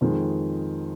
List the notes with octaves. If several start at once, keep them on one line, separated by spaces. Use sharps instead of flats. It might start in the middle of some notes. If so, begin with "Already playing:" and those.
F2 D#3 G#3